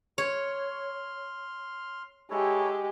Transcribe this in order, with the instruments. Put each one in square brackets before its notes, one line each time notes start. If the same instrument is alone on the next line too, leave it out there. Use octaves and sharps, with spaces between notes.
[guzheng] C#5 [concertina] C6 F6
[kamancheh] G#3 G4 [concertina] E4 A4 C#5